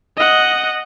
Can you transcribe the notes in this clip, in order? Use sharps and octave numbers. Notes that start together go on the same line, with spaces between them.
D#5 F#5